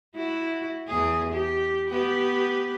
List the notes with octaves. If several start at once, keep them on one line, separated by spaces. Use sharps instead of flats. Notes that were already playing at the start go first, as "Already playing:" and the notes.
E4 F#4
E2 G#4
G4
B3 G4 B4